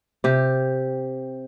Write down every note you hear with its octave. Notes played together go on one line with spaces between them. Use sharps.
C3 G4